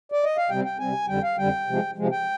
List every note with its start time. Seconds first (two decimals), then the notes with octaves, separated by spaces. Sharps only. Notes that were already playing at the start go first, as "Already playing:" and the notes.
0.12 D5
0.24 D#5
0.37 F5
0.50 C3 G3 C4 G5
0.65 G5
0.79 C3 G3 C4 G#5
1.08 F2 D3 G3 G5
1.23 F5
1.38 F2 D3 G3 G5
1.67 C3 F3 G#3
1.97 C3 F3 G#3
2.12 G5